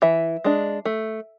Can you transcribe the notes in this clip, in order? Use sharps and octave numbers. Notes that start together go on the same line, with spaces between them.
E3 E5
G#3 D4
A3